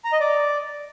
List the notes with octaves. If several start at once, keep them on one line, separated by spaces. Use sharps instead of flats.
A#5
D#5
D5